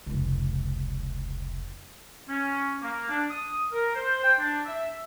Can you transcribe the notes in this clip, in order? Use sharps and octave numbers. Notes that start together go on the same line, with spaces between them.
F1 C#2
C#4
A#3
D4
D#6
A#4
C5
G5
D4
E5